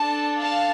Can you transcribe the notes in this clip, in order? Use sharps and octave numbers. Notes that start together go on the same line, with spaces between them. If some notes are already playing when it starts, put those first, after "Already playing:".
Already playing: D4 A4 A5
F5 A5